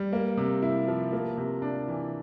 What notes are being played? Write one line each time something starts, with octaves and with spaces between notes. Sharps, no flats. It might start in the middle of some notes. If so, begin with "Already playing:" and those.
Already playing: G3
A#3
C3
E4
F3
A#3
C3
D4
E3